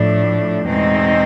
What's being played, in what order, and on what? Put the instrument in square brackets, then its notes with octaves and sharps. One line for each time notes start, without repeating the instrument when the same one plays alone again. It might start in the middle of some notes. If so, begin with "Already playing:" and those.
Already playing: [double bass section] A2 [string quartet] F3 A3 D4
[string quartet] E2 B2 G#3 C4 D#4